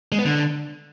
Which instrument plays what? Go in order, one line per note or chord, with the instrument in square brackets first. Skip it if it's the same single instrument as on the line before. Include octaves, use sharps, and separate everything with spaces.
[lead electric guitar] G#3
B3
D3